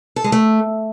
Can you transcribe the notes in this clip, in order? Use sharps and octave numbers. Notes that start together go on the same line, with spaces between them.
A4
G#3
A3